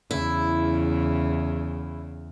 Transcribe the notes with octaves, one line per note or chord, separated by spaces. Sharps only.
E2 C#3 E4